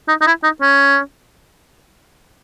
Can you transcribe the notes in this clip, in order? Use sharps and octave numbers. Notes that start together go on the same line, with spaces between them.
D#4
D#4
E4
D#4
C#4